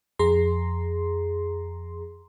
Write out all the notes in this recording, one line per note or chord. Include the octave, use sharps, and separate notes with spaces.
F2 G#4 A#5 C6